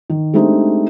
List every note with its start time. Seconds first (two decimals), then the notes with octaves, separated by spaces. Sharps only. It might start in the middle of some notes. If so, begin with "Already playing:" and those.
0.10 D#3
0.34 G#3 A3 C4 D4 D#4 G4